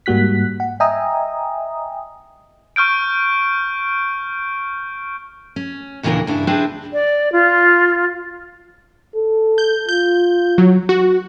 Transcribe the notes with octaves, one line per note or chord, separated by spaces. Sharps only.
G#2 G3 A#3 F#4 F#6 B6
F#5
D#5 E5 G5 G#5 A#5 D#6
C#6 F6 G6 D7
C#4
D#2 A#2 C#3 E3 D4 A#4
G2 C#3 D4 E4
C4 D4 E4 G#4 B4 C5
D5
F4
A4
G6
F4 G6
F#3
F#4